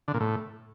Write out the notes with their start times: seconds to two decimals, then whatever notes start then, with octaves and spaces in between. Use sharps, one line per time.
0.08 D3
0.14 A#2
0.20 A2